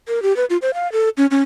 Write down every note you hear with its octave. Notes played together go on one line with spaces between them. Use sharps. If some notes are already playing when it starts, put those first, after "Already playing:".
A#4
G4
B4
F4
C5
F5
A4
C#4
C#4